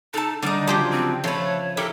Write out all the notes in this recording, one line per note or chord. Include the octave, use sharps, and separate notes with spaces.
D#4 A4 A5
D3 G3 D4 D#4 D5
C#3 F3 F#3 G4 C5
C4
F3 A3 B4 C#5
E4 G4 A4 A#4